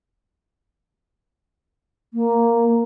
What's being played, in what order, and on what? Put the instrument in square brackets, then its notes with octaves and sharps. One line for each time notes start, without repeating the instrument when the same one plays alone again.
[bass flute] A#3